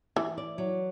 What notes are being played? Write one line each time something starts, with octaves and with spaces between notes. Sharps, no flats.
E3 E4
D5
F#3